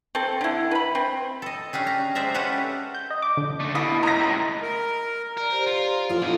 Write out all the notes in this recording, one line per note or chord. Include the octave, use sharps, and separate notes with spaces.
C4 A4
D3 E4
B4 B5
C4
A4 D#5
C#4 D4 G4 G#4
A#5
G#3 C5 D5 E5 A#5
C#4 G4 A4 B4 F#5
G6
D#5
D6
D3
D3 A3
B2 E4 D#5 D#6
C#2 A#5 A#6
A2 G#3
A#4
A#4 D5 A#5
G4 C5 D5
F4
F#2 F3 E4 F4 A4
B2 D4 F4 D#5